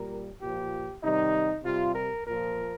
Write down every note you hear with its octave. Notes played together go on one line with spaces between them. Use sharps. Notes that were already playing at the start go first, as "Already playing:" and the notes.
Already playing: A#2 G3 A#4
A#2 F3 G4
C3 D#3 G3 D#4
C3 G3 F4
A#4
A#2 F3 A#4